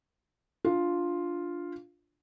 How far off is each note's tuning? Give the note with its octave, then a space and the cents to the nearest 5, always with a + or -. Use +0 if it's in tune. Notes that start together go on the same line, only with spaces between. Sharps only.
D4 +0 F4 +0